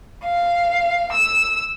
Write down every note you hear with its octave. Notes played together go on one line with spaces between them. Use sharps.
F5
E6